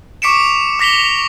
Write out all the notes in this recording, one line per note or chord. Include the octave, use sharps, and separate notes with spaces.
C#6 D6 B6 C#7 D7 E7
D6 A#6 B6 F7 G7